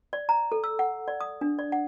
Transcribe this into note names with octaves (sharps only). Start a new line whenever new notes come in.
D5
A#5
A4
E6
F#5
D5
D#6
D4
D5
F#5